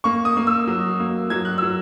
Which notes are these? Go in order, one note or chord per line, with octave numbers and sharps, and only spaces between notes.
A#3 C#6
D#6
A#3
E6
F#3
A#3
F#3 G#6
F#6
F#3 E6